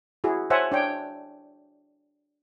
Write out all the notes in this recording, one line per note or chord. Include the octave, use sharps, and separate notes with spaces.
E4 F#4 G#4
C5 C#5 E5 F#5 G#5 A5
D4 C#5 G5